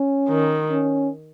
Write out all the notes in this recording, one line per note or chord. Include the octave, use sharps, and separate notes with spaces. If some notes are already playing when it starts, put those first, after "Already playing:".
Already playing: C#4
D#3
C#4